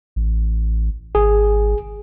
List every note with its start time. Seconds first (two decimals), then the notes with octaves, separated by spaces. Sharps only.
0.16 A1
1.15 G#1 G#4